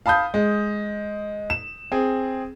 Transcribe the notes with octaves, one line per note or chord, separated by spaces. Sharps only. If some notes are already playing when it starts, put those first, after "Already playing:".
F5 A5 B5 D#6 G6
G#3
E7
C4 G#4